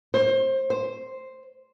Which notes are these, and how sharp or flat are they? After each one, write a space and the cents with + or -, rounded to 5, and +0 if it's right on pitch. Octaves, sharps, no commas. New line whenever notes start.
C5 +25
C5 +0